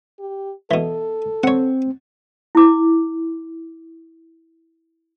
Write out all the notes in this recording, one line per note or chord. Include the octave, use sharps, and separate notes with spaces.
G4
B2 E3 A4
C4 C#5 F#5
E4 D6